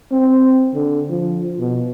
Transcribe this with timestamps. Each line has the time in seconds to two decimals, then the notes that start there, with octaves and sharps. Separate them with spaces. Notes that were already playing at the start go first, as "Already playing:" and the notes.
0.12 C4
0.73 D3
1.09 F3
1.59 B2